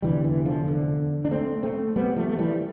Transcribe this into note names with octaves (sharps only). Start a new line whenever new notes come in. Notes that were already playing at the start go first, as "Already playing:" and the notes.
F1 E2 D3 E3 G3
E3
D3 F3
D3
D4
A3 C4
A3 C4
G3 B3
F3 A3
A3
E3 G3